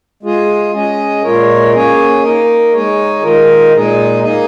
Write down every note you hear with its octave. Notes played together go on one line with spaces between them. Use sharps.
G#3 F4 G#4
G#3 C#4 G#4 D#5
A#2 G#3 F4 A#4 C#5
A#3 C#4 G#4 C#5
A#3 D#4 A#4 D#5
G#3 D#4 G#4 C#5
D#3 G#3 F4 A#4 D#5
A#2 G#3 D#4 G#4
A#3 D#4 G#4 D#5